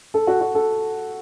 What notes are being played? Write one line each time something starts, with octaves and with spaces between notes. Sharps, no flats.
A4
F#4
F#4
A4